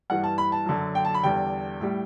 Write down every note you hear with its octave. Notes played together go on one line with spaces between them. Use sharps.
G2 E3 G3 F#5
A5
B5
A5
F#2 D3 F#3
G5
A5
B5
E2 D3 G3 G5
A2 G3